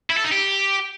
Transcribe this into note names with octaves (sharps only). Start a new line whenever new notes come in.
E4
A4
D#4
G4